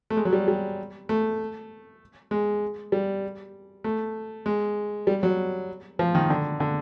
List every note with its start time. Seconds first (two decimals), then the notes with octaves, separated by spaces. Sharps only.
0.10 A3
0.17 G#3
0.25 F#3
0.33 G3
0.48 G3
1.09 A3
2.31 G#3
2.92 G3
3.84 A3
4.46 G#3
5.07 G3
5.23 F#3
5.99 F3
6.15 D#3
6.30 D3
6.60 D3